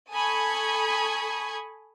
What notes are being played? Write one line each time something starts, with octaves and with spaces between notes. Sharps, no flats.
A4 G#5 B5 C#6 D#6 G#6